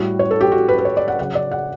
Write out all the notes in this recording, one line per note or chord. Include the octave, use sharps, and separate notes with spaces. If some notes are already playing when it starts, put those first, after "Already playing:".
Already playing: A2 G3 F#4
C#5
A4
G4
F#4
B4
B4
C#5
D5
F#5
C#3 F#3 F#5
D5
F#5